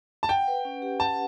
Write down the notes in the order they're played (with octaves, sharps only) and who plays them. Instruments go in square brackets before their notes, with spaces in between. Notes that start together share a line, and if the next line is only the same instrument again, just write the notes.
[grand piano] A5
[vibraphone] F#5 [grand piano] G5
[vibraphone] B4
C#4
G4
[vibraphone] F#5 [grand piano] A5